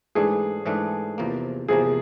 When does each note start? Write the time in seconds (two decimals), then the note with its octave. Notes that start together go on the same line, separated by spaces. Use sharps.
0.15 G#2 E3 A3 D4 G#4
0.66 G#2 E3 A3 D4
1.18 E2 C3 F3 A#3
1.68 E2 C3 F3 A#3 G#4